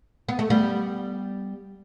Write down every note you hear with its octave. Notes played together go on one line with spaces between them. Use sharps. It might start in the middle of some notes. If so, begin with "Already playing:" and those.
B3
A3
G3 B3